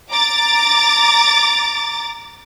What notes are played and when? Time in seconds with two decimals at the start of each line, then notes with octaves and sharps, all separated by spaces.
0.10 A#5 D6 A6